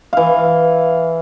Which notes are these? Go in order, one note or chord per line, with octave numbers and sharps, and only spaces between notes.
E3 F5